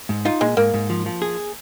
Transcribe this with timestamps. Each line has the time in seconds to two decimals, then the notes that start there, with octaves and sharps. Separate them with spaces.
0.09 G#2
0.25 D#4 F4
0.41 A#2 G#3
0.57 G#2 A#3
0.74 G#2
0.90 F3
1.06 F3
1.22 G#4